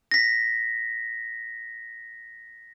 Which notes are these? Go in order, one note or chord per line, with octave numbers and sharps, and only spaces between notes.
A#6 B6